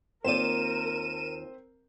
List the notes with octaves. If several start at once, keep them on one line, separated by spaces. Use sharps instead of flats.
D#2 C4 F4 A#4 C5 D5 D#7 E7